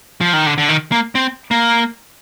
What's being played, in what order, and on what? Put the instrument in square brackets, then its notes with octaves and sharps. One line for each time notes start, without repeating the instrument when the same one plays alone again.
[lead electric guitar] F3
D#3
D3
D3
D#3
A#3
C4
A#3